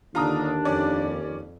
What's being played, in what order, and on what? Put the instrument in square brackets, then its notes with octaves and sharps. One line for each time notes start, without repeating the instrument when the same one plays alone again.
[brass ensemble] D#2 [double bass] D3 [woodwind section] D4 [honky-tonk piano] F4 A#5 D#6
[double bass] F2 [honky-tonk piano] C#4 D5